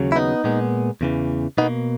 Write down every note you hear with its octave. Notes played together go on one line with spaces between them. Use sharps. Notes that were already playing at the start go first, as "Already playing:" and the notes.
Already playing: D#2 C#3 F#3
E4
B3 D#4
A#2 G#3 B3
E2 C#3 E3
B2 A#3 B3 D#4